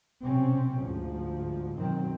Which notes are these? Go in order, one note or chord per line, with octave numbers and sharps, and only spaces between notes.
B1 C3 C4 C#4
D2 G#2 F3
F#2 B2 D#3 F#3 C4